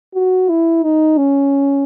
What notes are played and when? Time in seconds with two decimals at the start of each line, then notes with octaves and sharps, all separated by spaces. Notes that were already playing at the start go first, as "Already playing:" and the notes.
0.15 F#4
0.49 E4
0.84 D#4
1.17 C#4